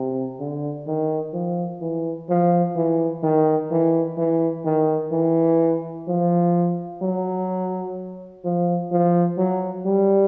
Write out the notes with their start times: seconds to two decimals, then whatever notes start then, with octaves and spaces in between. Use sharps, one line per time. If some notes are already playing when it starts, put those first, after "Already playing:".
Already playing: C3
0.40 D3
0.87 D#3
1.34 F3
1.81 E3
2.30 F3
2.76 E3
3.23 D#3
3.71 E3
4.18 E3
4.65 D#3
5.12 E3
6.08 F3
7.02 F#3
8.45 F3
8.92 F3
9.38 F#3
9.85 G3